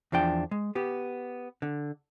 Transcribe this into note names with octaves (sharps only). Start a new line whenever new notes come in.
E2 F3 D4 G5
G#3
B3 G4
D3